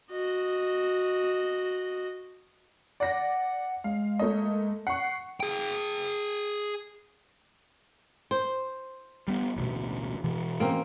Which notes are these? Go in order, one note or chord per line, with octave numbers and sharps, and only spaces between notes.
F#4 D#5
D5 F#5 A#6
G#3 F5
A3 A#3 D#5
F#5 C#6 C7
G#4 G5
C5
G3 B3
A1 D2 B2
B2 E3
A#3 C4 C#4